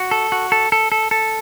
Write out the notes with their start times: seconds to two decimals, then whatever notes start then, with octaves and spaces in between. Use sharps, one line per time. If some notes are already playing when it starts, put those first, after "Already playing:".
Already playing: F#4
0.11 A4
0.32 F#4
0.52 A4
0.72 A4
0.92 A4
1.11 A4